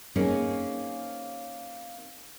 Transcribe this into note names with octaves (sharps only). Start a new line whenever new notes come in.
A#3 C4 C#4 D#4 G#4